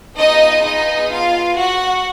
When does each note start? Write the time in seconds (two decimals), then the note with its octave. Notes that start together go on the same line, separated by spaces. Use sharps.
0.17 B3 D#4 F4 G#4 D#5
0.63 D#4 D#5
1.11 F4 F5
1.57 F#4 F#5